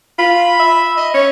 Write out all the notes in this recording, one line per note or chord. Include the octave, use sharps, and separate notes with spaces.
F4 B5
E5
D#5
C#4 C#5